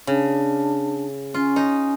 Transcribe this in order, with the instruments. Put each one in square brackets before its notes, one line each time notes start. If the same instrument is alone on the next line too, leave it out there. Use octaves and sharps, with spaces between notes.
[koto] C#3 [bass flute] D4
[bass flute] C#4 [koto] F4
[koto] D#4